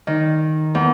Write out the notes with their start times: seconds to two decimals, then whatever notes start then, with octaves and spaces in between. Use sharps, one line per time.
0.07 D#3
0.75 E2